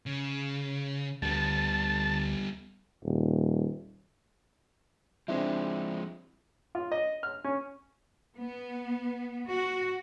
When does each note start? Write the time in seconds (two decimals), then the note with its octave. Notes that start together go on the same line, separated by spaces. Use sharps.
0.06 C#3
1.22 D2 G3 B3 A5
3.03 D#1
5.28 F3 G#3 C4 D4 E4
6.75 F4
6.92 D#5
7.23 F6
7.44 C#4
8.37 B3
9.50 F#4